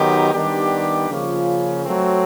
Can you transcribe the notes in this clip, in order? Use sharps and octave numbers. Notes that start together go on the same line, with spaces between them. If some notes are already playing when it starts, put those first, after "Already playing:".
Already playing: D#3 F#3 B3 D#4 G4
D#3 G3 B3 D4 G4
C#3 F3 A#3 C#4 F4
F#3 A3 C4